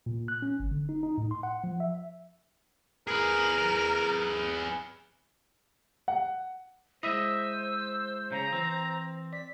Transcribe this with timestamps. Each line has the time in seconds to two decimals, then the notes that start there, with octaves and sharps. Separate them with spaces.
0.06 A#2
0.28 F#6
0.42 C#4
0.60 G1
0.71 D3
0.89 D#4
1.03 D#4
1.18 A2
1.31 C6
1.43 F#5
1.64 F3
1.80 E5
3.08 G#4 A#4 B4
6.08 F#5
7.03 G#3 E4 C5 D#5 E5
7.25 E6
8.32 C#3 A#5
8.53 E3 C4
9.33 D5 B6